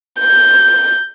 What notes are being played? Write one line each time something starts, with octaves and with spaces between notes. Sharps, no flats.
G6